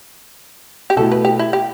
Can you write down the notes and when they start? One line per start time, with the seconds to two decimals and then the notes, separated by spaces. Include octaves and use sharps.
0.90 G4
0.96 B2 A3 E4 A4
1.11 B4
1.25 G4
1.39 E4
1.53 G4